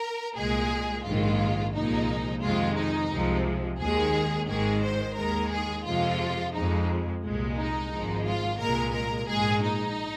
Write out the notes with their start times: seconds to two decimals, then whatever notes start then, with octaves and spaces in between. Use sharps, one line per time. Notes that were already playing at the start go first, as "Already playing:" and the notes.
Already playing: A#4
0.36 C2 A#2 G#3 G#4
1.06 A#1 G#2 D#3 G#3 F4
1.74 C2 A#2 F3 G#3 D#4
2.42 F2 C3 D#3 G#3 F4
2.76 D#4
3.11 C2 C3 F3 G#3
3.79 D#2 D#3 G#3 G#4
4.48 G#1 G#2 D#3 G#3 G#4
4.82 C5
5.16 D#2 D#3 G#3 A#4
5.51 G#4
5.86 F2 C3 F3 G#3 F4
6.53 F2 F3 G#3 D#4
7.22 C2 A#2 G#3
7.57 D#4
7.91 G#1 G#2 F3 G#3
8.26 F4
8.59 C2 A#2 G#3 A#4
8.94 A#4
9.28 A#1 G#2 G#3 G#4
9.62 D#4